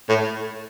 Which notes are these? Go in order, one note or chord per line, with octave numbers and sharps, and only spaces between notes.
A2